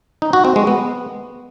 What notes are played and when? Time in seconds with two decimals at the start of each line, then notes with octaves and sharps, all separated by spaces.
0.22 D#4
0.33 F#4
0.45 C4
0.56 G#3
0.67 B3